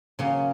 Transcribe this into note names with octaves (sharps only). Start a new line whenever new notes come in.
C#3 F#3 A#3 C#4